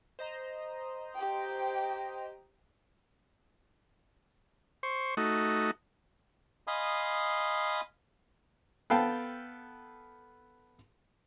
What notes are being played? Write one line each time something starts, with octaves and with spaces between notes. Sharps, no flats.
C5 D#5 A#5
G4 G5
C5 C#6
A3 D#4 F#4
D#5 F5 G#5 B5 C6 D#6
B3 A4 F5 G5 A5